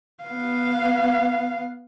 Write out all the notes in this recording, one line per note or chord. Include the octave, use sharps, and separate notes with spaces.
B3 F5